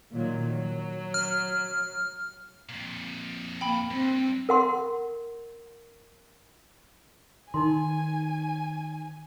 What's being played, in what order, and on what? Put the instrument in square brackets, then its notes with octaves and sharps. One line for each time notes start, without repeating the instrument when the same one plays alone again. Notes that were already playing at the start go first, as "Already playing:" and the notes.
[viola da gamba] A#2 D#3 F#3
F#3
[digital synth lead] F6
[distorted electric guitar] F2 A#2
[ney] A#3 [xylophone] G5 B5
[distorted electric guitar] G2 [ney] C4
[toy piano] A#4 F#5 C6
[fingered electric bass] D#3 [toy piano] D#4 A#4 C6 [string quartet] G#5